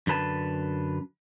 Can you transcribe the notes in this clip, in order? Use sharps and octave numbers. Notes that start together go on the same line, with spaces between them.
F#2 D3 B4 A5